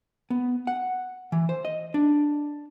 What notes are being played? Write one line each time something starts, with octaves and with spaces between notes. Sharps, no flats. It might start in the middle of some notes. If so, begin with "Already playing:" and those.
B3
F#5
E3
C5
D#5
D4